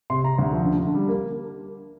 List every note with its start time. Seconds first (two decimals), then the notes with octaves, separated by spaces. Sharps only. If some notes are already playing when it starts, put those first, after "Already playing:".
0.10 C3 C6
0.23 C3 A#5
0.38 D2
0.53 F3
0.66 D3
0.80 D3
0.94 G3
1.08 A#3